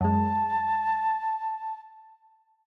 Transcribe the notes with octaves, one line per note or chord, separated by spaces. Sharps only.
F#2 G#3 A5